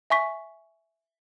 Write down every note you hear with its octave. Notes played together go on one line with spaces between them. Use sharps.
E5 G#5 C#6 B6